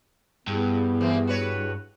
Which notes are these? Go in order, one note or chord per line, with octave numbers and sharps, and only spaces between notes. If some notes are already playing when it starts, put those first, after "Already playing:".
G2 B3 E4 G4 G#4
E3 A#3 C4
F#4 B4 C#5